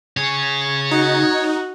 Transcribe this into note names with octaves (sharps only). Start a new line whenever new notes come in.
C#3 G#4 C#5
D#4 F#4